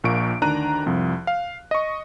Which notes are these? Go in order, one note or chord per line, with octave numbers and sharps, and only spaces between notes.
A#1 A#2 A#3 C#6 D7
D2 D#3 D4 A#5 F#6 D#7
C2 F2 F3
F5
D#5 C#6